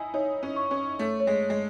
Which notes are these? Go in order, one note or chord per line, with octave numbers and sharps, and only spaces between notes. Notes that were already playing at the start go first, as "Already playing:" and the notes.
Already playing: D#4 E4 G#5
D#4 C#5
C#5
C#4
C#6
C#4
C#6
A3 C#5
C#5
G#3
C#5
G#3